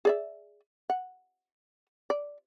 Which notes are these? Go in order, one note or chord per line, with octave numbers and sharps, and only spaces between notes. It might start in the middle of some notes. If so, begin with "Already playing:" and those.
G#4 D5 E5
F#5
D5